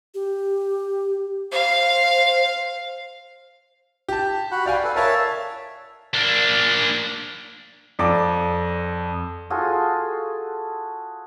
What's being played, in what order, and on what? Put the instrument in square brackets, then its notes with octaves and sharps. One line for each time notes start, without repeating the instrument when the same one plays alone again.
[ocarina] G4
[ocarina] C5 [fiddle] F5
[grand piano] G4 A5
[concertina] F#4 F#5 B5
[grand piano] D5 F5 G#5 [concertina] G5
[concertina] A4 B4
[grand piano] A#4 F5 [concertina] C#5 E5 A5
[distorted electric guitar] A#3 D4
[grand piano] F2 D5 D6
[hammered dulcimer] F4 F#4 G#4 A4